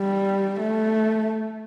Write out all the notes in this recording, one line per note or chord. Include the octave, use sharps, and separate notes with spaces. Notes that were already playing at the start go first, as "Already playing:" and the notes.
Already playing: G3
A3